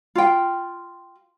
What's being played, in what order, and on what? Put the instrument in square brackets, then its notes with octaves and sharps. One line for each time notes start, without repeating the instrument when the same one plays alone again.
[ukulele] F4 G5